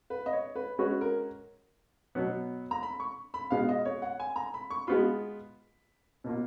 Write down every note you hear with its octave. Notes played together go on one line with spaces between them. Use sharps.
B4
D#5
C#5
B4
G#3 C#4 F#4 B4 C#5
A#4
B2 F#3 B3
A#5
B5
C#6
B5
B2 G#3 B3 F4 F5
D#5
C#5
F#5
G#5
A#5
B5
C#6
G#3 B3 F4 B5
B2 A#3 F4